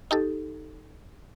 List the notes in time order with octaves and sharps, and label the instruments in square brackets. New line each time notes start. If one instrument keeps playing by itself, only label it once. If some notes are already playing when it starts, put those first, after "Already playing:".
[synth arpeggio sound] D#4 G4 A4